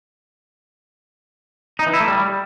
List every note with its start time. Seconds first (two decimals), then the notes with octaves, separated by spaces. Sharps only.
1.79 D#4
1.86 E3
1.93 E4
2.00 A3
2.08 G3